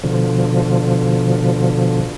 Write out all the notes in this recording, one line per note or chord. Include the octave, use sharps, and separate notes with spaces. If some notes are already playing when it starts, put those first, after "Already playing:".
B2 D3 F3